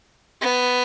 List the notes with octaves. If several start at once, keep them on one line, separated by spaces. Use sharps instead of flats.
B3